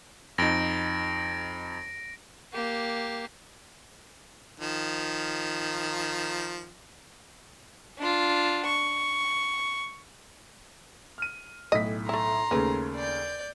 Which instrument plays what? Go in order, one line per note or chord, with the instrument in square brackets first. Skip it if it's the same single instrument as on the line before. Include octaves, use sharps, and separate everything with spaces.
[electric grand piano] F2 D#4 [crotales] A#6 D7
[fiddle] A#3 G4
[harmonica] D#3 F3
[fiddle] D4 F4
C#6
[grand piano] F6 D#7
[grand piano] B1 A2 B6 [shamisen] D#5
[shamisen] A3 E4 [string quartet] A#5 C6
[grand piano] D#2 C#3 A3 [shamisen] A#3 C#4 B4
[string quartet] D5 G6